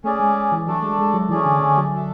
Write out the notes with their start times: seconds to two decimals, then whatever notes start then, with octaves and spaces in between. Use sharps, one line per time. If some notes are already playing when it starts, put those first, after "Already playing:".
0.04 A3 C#4 G#4 D5
0.20 G#3
0.52 E3
0.67 F#3 A3 D4 A4 D5
0.83 G#3
0.99 G#3
1.14 F#3
1.29 E3 A3 C#4 G#4 D5
1.45 D3
1.62 D3
1.77 F#3
1.93 D4 A4 E5